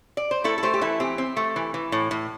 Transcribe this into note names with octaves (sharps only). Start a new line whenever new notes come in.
D5
C5
A3 E4 A4
A4
A3 G4 C5
G4
E3 E4 A4
C4 G4
C4
A3
E3
E3
A2
A2